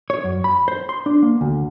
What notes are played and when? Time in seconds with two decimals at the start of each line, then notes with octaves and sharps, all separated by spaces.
0.10 C#5
0.24 F#2
0.44 B5
0.68 C5
0.89 C6
1.06 D4
1.23 A#3
1.41 D2